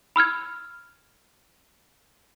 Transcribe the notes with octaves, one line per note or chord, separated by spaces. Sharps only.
B5 E6 F6 G#6